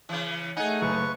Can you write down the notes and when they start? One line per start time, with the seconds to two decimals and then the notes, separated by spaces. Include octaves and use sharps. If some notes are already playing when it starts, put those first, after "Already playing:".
0.09 C#3 E3
0.57 A3 D#4 G#4 F#5 G#5
0.82 F#1 B4 C#6